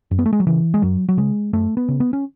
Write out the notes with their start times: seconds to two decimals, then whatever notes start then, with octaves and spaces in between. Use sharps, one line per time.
0.11 F#2
0.19 B3
0.26 A3
0.33 G#3
0.40 F#3
0.47 C#3 E3
0.74 G#3
0.82 F#2 F#3
1.09 F#3
1.17 C#3 G#3
1.53 F#2 A3
1.77 B3
1.88 C#3
2.00 B3
2.13 C#4